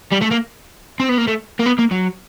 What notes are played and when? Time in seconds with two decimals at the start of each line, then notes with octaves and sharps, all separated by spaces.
0.12 G3
0.22 A3
0.32 A#3
1.00 C4
1.09 B3
1.18 A#3
1.28 A3
1.60 A#3
1.66 B3
1.79 A#3
1.91 F#3